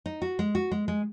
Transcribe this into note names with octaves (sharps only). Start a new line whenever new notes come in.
D#4
F#4
G#3
F#4
G#3
G#3